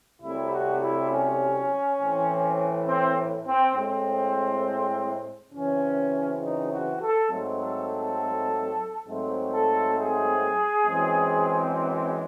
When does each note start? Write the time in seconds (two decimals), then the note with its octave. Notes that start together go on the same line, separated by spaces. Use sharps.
0.21 C2 C3 F#3 A3 C4 E4
0.51 F#4
0.80 E4
1.10 C#4
1.99 A2 E3 C4
2.87 C4
3.47 C4
3.76 A2 G#3 C4
5.53 F#2 C#3 E3 C4 C#4
6.42 D#4
6.72 F#4
7.01 A4
7.31 G#2 F#3 A3 C4
7.61 A4
7.89 A4
9.08 G#2 F#3 A3 C4
9.53 A4
9.97 G#4
10.85 F#2 E3 G#3 C4